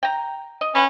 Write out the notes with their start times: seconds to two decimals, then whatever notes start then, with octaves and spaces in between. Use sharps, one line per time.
0.03 G5 A#5
0.61 D#5
0.75 C#4 B4 F#5